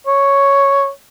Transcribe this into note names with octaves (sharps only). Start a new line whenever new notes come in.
C#5